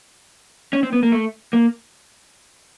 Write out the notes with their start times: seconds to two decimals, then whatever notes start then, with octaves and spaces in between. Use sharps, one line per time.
0.73 C#4
0.83 C4
0.93 B3
1.03 A#3
1.12 A3
1.53 A#3